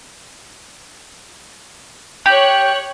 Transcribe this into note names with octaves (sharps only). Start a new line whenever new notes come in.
G4 C#5 F#6